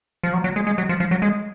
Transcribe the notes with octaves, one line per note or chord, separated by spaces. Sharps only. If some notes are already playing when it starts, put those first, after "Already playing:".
F3
F#3
F#3
G#3
G#3
F#3
F3
F3
F#3
G#3